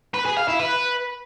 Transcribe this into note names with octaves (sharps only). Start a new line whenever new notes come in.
B4
G#4
F5
E4
B4